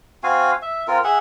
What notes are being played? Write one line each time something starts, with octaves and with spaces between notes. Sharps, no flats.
C4 F#4 F5 G#5
E5
C4 F4 A#4
G#4 E5 F#5